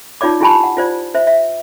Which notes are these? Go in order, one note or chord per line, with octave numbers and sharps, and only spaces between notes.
D#4 F4 C#5 D5 D6
E4 F4 G4 G#5 A5 B5
F#5
F4 C5 D5
C5 E5
E5